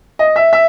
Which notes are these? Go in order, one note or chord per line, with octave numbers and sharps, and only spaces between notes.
D#5
E5
E5